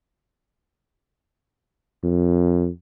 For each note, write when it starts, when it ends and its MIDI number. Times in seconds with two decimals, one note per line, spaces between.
2.04 2.69 41